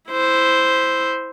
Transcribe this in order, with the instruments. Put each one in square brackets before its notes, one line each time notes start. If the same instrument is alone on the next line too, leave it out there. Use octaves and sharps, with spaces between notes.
[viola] E4 C5